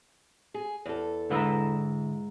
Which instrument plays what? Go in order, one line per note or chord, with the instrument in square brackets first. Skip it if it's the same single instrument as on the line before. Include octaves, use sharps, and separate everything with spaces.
[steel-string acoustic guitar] G#4
E2 A4
[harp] G#2 E5 A#5 [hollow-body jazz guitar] D3 E4 B4